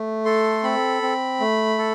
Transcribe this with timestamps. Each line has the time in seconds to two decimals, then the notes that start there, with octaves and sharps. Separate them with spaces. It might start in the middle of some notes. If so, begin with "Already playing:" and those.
Already playing: A3
0.25 A4 C6
0.63 C4 B5
1.02 C4
1.40 A3
1.78 A4